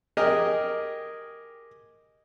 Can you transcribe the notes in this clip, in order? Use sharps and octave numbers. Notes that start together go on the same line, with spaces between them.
G4 G#4 A#4 D#5